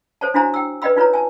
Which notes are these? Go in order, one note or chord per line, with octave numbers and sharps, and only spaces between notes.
A4 C5 C#5 A5
D4 E4 F#4 C5 G#5 A#5
G5 E6
B4 D5 D#5 G5 B5 E6
D#4 F4 B4 C#5 A#5
G#5 A5